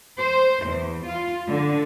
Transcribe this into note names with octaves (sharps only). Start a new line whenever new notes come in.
C5
E2
F4
D3